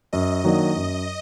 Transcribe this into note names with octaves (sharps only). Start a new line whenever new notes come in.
F#2 D#5
D#3 F#3 A#3 D4
F#2